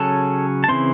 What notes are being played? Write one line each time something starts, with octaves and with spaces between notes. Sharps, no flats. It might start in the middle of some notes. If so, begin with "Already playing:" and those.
Already playing: C#3 F#3 C#4 A4 A5
A5
C#3 E3 C4 C5 C6